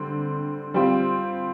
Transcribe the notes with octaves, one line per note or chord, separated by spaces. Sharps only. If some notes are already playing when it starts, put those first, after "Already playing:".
Already playing: D3 G3 C4
G3 C4 F4